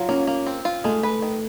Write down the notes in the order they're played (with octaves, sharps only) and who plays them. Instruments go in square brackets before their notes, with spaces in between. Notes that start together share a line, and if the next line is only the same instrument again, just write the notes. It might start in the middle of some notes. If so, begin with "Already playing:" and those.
Already playing: [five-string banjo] F#3 [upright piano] F4
[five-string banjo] A#3 [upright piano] C#4
[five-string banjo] A#3
C4
F4
[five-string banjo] G#3 [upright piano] A3
[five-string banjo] B4
D#3